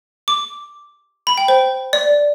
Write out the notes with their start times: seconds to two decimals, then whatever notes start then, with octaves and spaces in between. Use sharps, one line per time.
0.28 D6
1.27 B5
1.38 G5
1.48 C5
1.93 D5